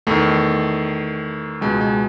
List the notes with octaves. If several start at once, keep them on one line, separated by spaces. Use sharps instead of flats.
E2 D#3 A3
C#2 B2 G#3
G#3